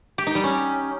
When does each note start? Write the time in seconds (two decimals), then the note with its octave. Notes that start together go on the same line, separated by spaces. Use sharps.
0.18 G4
0.27 D#4
0.35 G3
0.44 C#4